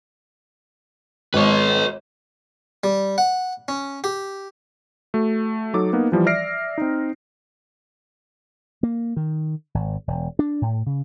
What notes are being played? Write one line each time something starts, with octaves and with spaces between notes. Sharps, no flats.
G#1 B4 C#5
G3
F#5
C#4
G4
A3 F#4
F#3 D#4 A4 D6
A#3 B3 D#4
E3 F3 G3
D5 E5 F6 A#6 C7 D7
C4 D#4
A#3
D#3
G#1
E1
D4
A2
C#3